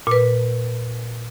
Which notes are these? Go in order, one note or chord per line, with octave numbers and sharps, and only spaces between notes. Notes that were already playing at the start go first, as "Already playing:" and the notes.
A#2 B4